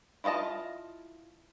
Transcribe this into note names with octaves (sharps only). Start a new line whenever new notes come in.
E4 F4 C5 D#5 A5